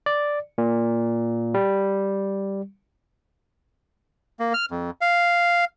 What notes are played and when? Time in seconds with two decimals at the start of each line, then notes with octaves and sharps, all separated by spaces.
0.06 D5
0.58 A#2
1.54 G3
4.39 A#3
4.54 F6
4.71 F2
5.01 F5